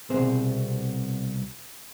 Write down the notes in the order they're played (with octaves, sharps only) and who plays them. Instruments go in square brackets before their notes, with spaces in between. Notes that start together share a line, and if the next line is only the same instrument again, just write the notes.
[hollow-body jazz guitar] C2 B2 C4 G#4 C5